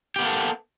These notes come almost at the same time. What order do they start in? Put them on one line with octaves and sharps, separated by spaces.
G4 B3 A#3 A4